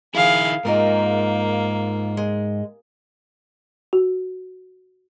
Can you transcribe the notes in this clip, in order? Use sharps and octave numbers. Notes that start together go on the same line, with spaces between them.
D#3 F3 E4 G#4 F5
G#2 A#3 D#4 F4 A#4
G#3
F#4